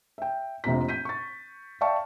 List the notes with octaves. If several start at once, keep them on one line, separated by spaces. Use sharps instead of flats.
E5 G5
F1 A#1 C3 F4 A#5 B6
G6 B6 D#7
C#6 A6
D5 E5 F5 G5 A5 C#6